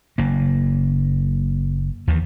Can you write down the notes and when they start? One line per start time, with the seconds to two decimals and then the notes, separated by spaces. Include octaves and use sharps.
0.18 F#1 A#3
2.07 D#2 D#3 E3